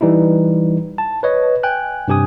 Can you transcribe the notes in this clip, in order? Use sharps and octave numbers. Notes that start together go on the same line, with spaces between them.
E3 G3 D#4 E4
A5
B4 C#5 D#5
G5 G#5 F#6
G2 C3 G4 G#5 D#6